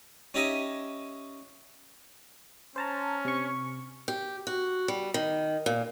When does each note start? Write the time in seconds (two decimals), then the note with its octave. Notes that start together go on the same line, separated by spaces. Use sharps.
0.34 C#4 D#4 G4 D#5 E5 G#5
2.76 C#4 C5 A5 A#5
3.25 C3 C#6
4.08 G4
4.47 F#4
4.88 G3
5.14 D#3
5.66 A#2